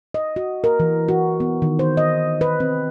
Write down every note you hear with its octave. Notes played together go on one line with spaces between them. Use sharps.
D#5
F#4
A#4
E3
F#4
B3
D#3
C5
D#5
B4
C4